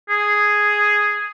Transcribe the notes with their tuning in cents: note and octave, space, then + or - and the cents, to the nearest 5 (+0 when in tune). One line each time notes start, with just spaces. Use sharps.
G#4 +0